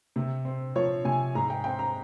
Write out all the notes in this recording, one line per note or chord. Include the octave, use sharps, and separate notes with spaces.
C3
C4
F3 C#5
C3 G#5
G#2 A#5
G5
C4 G5
A#5